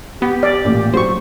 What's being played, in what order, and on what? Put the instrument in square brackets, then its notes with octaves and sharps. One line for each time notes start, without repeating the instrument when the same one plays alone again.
[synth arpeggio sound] B3 [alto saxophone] G4
[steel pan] D5
[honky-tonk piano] A1 A#2 D6
[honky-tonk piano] F#3 [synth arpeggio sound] C5 C#6